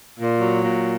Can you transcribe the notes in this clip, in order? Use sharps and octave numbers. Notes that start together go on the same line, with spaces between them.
A#2
F#3
A#2